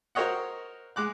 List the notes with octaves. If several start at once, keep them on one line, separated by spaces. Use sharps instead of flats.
F#4 A#4 C5 C#5 D#5 F#5
G#3 D6 F#6